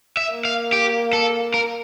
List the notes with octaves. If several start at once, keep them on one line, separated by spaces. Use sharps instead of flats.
E5
A#3
F5
G4
A4
A#4